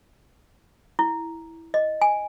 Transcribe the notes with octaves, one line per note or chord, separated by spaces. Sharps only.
E4
D#5
G#5